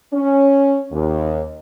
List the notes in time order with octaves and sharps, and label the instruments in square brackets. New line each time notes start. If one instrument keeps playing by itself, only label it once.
[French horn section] C#4
D#2